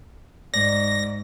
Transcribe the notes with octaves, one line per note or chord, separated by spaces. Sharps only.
G#2 D5 A#6